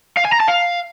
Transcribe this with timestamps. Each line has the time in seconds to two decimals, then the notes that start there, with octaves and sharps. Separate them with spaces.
0.17 F5
0.25 G#5
0.32 A#5
0.40 A5
0.48 F5